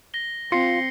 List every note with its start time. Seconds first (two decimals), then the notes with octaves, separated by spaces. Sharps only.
0.14 A#6 G7
0.52 C4 F4 C7 C#7